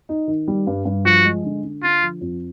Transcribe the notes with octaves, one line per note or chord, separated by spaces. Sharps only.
D#4
D#3
G3
G2
G2
F3 F#4
G#3
D3
D3
D3 F4
F3
F2